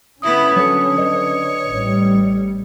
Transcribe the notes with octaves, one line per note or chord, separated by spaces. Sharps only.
D3 B3 C#4 E4 D#6
F#3 A4 C#5
B4 D5 D#5
A1 G3